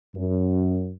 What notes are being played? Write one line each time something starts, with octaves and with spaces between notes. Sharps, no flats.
F#2